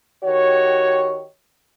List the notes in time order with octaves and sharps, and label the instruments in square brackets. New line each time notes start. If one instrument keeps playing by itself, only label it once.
[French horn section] D#3 F#4 G4 C#5